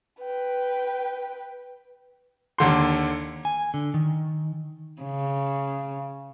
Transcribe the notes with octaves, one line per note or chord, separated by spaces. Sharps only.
B4 G5
D#2 D3 C6
G#5
D3
D#3
C#3